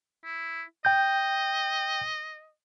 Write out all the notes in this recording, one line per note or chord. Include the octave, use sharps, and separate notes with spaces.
E4
D#5 G5 G6